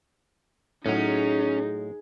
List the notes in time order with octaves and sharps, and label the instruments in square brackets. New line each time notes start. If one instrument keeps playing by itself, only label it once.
[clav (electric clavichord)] A2 F#3 [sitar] G#3 [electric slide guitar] C#4 [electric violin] D#4